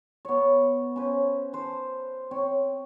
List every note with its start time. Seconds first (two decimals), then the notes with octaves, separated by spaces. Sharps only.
0.25 B3 C#5
0.96 C#4 B4 C5
1.53 B4 C5 A5
2.31 C4 C#5